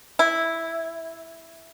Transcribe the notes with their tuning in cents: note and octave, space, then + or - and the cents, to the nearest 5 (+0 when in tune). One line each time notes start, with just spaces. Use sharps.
E4 -5